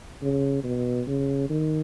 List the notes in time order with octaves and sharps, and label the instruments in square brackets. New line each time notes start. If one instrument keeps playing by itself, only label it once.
[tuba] C#3
B2
C#3
D#3